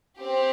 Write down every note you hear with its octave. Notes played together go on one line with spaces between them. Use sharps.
C4 G4